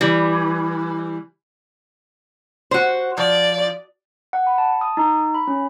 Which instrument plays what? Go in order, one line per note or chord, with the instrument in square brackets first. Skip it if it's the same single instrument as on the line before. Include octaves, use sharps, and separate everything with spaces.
[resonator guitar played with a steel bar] E3 G3
F#4 C5
[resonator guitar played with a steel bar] F3 [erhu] D5
[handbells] F#5
B5
A5
D#6
D#4
B5
C#4